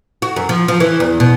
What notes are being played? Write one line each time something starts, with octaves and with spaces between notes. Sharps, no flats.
F#4
F#2
F3
F3
E3
E2
B2